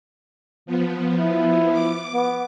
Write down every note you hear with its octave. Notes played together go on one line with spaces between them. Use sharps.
F3 B3
E4
D6
B3